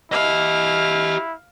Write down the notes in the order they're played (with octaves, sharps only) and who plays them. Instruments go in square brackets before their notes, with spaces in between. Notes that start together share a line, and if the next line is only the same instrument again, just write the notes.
[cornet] E4 [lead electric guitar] G4 D#5 [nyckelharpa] F5